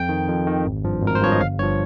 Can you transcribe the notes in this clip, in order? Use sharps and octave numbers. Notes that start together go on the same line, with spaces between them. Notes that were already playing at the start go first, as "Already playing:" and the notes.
Already playing: F2 G5
D#3
F2
D#3
G#1
G2 F3
G#1 A#4
C5
G2 F3 C#5
D#5
G1 F5
G2 F3 C#5